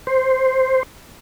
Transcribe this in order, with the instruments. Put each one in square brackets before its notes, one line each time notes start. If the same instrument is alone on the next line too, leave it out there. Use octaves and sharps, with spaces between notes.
[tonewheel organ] C5